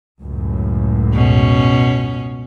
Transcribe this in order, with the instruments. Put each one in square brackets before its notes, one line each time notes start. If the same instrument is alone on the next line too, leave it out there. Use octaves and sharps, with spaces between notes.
[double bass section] C#2 F#2 A2
[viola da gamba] B2 C#4